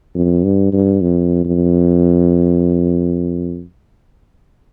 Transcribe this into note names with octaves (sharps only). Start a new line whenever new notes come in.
F2
G2
G2
F2
F2